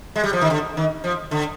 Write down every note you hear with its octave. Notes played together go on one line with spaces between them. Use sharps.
G#3
G3
F3
D#3
D3
D#3
F3
D3